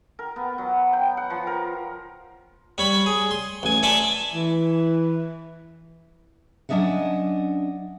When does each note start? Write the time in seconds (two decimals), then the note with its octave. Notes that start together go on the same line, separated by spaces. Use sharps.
0.19 A#4
0.36 B3
0.58 F#3
0.93 G5
1.17 F#5
1.30 F3
1.47 A#4
2.78 G3 C#5 B5
3.06 G#4
3.31 C6
3.63 A1 G#5
3.83 A4 D5 E5 G#5 A5 C6
4.34 E3
6.69 F#3 C#4 D4 D#5 E5 F#5